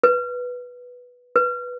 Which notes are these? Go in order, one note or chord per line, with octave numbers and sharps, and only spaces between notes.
B4
B4